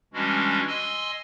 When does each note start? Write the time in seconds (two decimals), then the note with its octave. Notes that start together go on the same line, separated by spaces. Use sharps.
0.14 E3 G3 G#3 C#4 D4 F#4
0.68 D#5 G#5 C6 E6